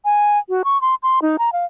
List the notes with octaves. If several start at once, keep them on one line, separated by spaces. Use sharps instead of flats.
G#5
F#4
C#6
C6
C6
D#4
A#5
F5